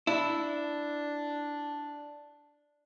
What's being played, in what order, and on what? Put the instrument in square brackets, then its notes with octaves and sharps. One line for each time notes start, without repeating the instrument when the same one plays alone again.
[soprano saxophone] D4 [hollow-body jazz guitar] E4